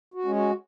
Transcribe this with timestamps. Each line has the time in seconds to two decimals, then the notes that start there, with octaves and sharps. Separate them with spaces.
0.14 F#4
0.25 G#3 C#4
0.35 F#4